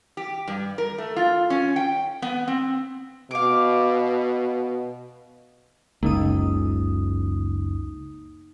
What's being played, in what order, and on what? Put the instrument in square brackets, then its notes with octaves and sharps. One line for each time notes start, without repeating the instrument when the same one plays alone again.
[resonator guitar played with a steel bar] G4
G2
A#4
A3
F4
C#4
G5
B3
C4
[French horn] B2 [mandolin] F5 D6
[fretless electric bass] F#1 C#2 [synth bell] A#3 D#4 D#6